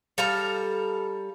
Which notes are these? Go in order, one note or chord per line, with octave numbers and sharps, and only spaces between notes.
G3 A4 F5 A#5